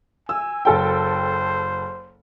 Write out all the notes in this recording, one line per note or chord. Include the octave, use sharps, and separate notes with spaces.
G#5 E6
F#1 A4 C5 G5